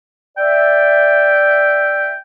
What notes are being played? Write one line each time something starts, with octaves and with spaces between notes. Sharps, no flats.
D5 E5 G5